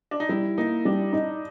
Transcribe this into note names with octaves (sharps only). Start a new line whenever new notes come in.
D4
D#4
G3 E4
A#3 D#4
G3 D4
D#4